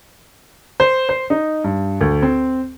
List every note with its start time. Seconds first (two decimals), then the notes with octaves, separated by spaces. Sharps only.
0.80 C5
1.09 C5
1.30 D#4
1.64 G2
2.01 D2
2.22 C4